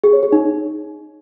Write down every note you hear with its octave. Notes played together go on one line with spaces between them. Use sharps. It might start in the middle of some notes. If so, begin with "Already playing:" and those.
G#4
C#5
G#4
D#4